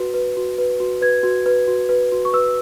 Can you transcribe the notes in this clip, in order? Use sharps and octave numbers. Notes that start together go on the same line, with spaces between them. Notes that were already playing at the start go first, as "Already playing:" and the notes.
Already playing: F#4 B4
B4
F#4
B4
F#4
B4 G#6
F#4
B4
F#4
B4
F#4
C#6
B4 E6